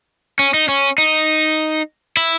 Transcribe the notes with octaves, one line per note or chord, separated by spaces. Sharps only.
C#4
D#4
C#4
D#4
E4